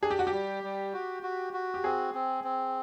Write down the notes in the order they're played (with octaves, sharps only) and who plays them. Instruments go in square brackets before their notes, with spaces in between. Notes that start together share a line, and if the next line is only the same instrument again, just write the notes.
[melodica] D4 [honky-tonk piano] G#4
[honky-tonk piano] G4
F#4
G4
[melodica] G3
G3
F#4
F#4
F#4
[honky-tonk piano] G4
[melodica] C4 [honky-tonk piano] G#4
[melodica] C4
C4